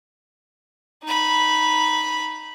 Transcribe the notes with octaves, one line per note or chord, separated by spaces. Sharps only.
D#4 B5